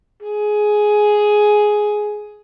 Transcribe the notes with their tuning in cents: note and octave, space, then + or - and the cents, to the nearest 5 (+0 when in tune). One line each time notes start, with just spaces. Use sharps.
G#4 +10